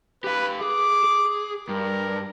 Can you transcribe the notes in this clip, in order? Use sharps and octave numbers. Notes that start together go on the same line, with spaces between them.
G4 B4 F5
G#4 D6
G#4
G2 A#4